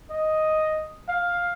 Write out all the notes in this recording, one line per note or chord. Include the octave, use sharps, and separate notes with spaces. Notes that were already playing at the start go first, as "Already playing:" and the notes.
D#5
F5